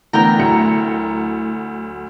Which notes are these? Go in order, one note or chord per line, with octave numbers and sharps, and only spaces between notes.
D3 E3 A3 B3 E4 A#4 G5 A#5
D2 F#3 C#7